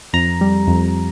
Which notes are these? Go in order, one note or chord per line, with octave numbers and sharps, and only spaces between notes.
F2 A#5
G3
F2